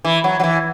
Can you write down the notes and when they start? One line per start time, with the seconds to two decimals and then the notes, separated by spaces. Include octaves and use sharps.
0.05 E3
0.24 F#3
0.40 F#3
0.44 E3